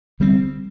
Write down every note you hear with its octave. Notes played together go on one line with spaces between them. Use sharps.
D3 G3 C4